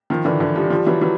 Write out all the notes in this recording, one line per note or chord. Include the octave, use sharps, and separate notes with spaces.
D#3 F3
D3 E3
D3 E3
F3 G3
F3 G3
E3 F#3
E3 F#3